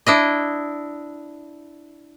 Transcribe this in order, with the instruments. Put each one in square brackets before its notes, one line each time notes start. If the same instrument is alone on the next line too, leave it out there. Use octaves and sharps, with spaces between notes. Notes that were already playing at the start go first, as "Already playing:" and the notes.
[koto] D4 E4 D#5